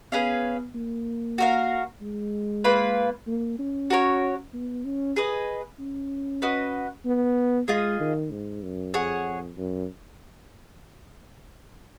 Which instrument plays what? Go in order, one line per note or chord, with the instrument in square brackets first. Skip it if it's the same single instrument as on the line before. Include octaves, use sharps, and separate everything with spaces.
[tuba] B3 [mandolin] C#4 G#4 B4 F5
[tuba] A#3
[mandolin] F#4 A#4 F5
[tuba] G#3
[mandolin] A#3 F4 B4
[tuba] A#3
C#4
[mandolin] F#4 A#4 C#5
[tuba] B3
C#4
[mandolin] G#4 B4 D#5
[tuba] C#4
[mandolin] F#4 B4 D#5
[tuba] B3
[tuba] G#3 [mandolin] F4 G#4 D#5
[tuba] D#3
G#2
F#2
[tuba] F2 [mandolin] G#4 C#5 F#5
[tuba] F#2